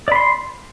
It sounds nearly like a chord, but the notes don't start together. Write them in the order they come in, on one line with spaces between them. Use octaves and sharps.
D5 B5 C6